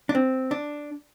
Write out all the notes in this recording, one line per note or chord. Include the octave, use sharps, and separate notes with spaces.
D4
C4
D4